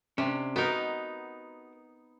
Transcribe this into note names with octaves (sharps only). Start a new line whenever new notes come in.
C3 C#4 D4
B3 D#4 F#4 A#4